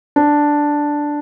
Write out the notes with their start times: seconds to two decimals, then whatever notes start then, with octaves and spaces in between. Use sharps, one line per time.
0.16 D4